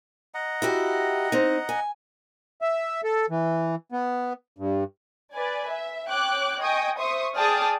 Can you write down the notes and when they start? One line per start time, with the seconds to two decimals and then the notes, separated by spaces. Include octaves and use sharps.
0.34 D#5 F#5 A#5
0.62 E4 F#4 G4
1.32 C4 D#4
1.69 G#5
2.62 E5
3.04 A4
3.30 E3
3.92 B3
4.58 G2
5.33 B4 D5 G#5
5.70 E5
6.09 C#5 G5 D6 F#6
6.60 D#5 G5 G#5 C#6 D#6
6.98 C5 E5 C6 C#6 D#6
7.35 G#4 D5 G5 A5 D#6 F6